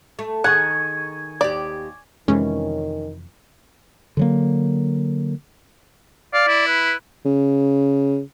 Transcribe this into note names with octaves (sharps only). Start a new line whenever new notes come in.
A3
D#3 G#4 F#5 G#5 C#6
D#2 G4 D5
F2 C3 D#3 E3 G#3 C#4
D3 F#3 A#3
D5 F5
E4
B4
C#3